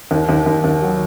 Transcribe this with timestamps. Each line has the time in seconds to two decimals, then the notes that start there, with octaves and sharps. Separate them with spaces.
0.11 D#2
0.29 D#2
0.46 D#2
0.64 D#2
0.82 F#3